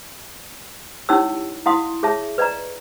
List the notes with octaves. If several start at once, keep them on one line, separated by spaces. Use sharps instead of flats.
C#4 D#4 E4 G4 C#5 E6
E4 D#5 F5 F#5 C6 D#6
G#4 C#5 E5 A5
B4 D5 D#5 A#5